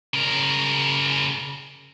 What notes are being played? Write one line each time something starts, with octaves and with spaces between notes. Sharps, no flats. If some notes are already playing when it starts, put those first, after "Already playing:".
C#3 A#4